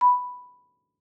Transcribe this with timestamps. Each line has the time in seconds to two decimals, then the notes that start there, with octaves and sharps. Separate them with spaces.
0.01 B5